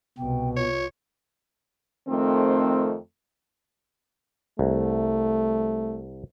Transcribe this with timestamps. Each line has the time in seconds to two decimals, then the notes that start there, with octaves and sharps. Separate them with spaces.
0.18 C2 B2 G5
0.57 F4 C#5
2.08 F2 D#3 A3 C4
4.59 C2 A3